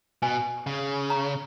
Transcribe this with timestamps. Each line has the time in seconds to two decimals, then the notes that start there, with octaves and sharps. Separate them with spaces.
0.22 B2 G#5
0.67 C#3
1.10 A#5